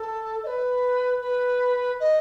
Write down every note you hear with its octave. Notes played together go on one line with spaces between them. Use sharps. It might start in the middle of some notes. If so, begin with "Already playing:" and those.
Already playing: A4
D#5
B4
B4
D#5